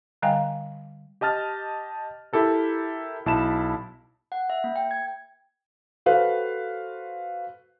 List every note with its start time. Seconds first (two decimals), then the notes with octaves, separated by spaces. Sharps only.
0.22 D3 G3 D#5 F5 G5 G#5
1.21 G4 D#5 A5 F6 A6
2.33 E4 G4 A4 A#4
3.26 B1 E4 A5 B5 E7
4.32 F#5
4.50 E5
4.64 A#3
4.76 G5
4.91 G#6
6.06 F#4 A4 B4 C5 F5 F#6